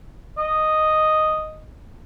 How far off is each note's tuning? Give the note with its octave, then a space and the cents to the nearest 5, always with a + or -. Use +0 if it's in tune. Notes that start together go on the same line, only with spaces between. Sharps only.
D#5 -5